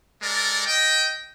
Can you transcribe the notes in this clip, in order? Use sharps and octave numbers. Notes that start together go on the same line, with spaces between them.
G#3 A4 A#4 D5
D#5 G5